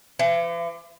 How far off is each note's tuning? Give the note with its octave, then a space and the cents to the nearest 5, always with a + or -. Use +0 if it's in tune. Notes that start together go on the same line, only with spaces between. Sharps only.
E3 +45